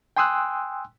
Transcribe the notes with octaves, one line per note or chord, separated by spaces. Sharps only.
G5 G#5 C6 D#6 E6 F#6